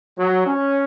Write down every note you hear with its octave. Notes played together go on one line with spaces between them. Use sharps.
F#3
C#4